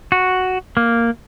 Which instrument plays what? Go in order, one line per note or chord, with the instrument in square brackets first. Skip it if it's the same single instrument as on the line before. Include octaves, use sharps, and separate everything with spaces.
[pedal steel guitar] F#4
A#3